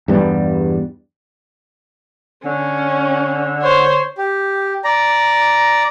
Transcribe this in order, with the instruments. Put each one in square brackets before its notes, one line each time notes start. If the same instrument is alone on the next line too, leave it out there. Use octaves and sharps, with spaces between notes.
[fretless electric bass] E2 G2 G3 B3
[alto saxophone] D3 [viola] C#4
[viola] C5 C#5
[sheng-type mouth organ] G4
D5 A#5